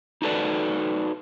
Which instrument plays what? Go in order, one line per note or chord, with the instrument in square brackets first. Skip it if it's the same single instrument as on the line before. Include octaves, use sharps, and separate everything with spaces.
[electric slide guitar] D#4 F#4 A4 B4 D5